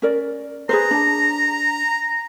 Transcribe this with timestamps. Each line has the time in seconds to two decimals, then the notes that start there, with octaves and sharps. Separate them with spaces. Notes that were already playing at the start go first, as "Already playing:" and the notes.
0.02 C#4 A#4 D5
0.69 G#4 B4 C5 A#5
0.91 D4 A5